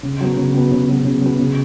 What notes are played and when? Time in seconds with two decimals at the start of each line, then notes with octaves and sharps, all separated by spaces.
0.03 C#3
0.21 F#3 B3
0.37 C#3
0.54 F#3 B3
0.72 C#3
0.89 F#3 B3
1.05 C#3
1.22 F#3 B3
1.39 C#3